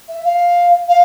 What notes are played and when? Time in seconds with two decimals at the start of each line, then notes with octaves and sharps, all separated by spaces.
0.09 E5
0.24 F5
0.88 F5